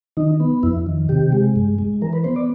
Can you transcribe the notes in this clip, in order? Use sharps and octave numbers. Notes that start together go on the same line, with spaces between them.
D#3 D#4
B3
F2 E4
D#3
C3 G4
G#3
G2
G#3
E3 A#4
B4
B3 C5
D5